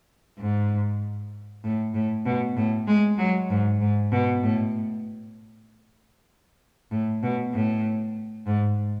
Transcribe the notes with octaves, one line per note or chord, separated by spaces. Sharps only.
G#2
A2
A2
B2
A2
G#3
F#3
G#2
G#2
B2
A2
A2
B2
A2
G#2